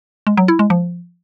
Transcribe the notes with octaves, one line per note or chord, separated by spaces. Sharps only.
G#3
F#3
E4
G#3
F3